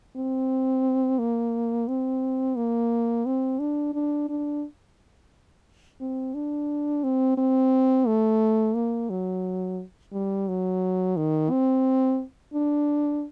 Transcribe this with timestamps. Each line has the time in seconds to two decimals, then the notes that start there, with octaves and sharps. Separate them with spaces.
0.16 C4
1.19 A#3
1.88 C4
2.56 A#3
3.26 C4
3.59 D4
3.94 D4
4.29 D4
6.01 C4
6.35 D4
7.04 C4
7.38 C4
8.07 A3
8.75 A#3
9.10 F#3
10.13 G3
10.48 F#3
11.17 D#3
11.51 C4
12.54 D4